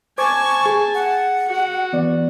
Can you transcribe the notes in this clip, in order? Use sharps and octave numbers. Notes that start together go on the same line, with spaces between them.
C5 G#5 A5 C#6 D6 G#6
G#4
F#5
F#4
E3 B3 D5